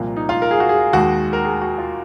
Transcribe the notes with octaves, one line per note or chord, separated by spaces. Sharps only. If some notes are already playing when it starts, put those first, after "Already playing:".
Already playing: C2 A#2 F3 A#3
D#4
F4
A#4
G#4
F#4
G#4
D#2 D#3 G#3 F#4
A#4
G#4
F#4
F4